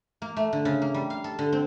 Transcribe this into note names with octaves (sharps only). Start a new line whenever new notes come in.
A#3
A3
D3
C#3
A#3
G3
F5
A4
D3
C4